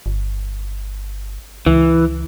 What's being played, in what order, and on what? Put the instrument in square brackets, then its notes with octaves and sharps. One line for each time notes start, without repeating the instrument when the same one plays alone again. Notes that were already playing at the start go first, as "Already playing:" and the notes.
[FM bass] G1
[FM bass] C#2 [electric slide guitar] E3